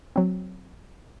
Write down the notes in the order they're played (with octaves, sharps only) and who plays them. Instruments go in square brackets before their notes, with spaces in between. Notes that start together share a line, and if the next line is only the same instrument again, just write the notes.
[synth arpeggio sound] F#3 C4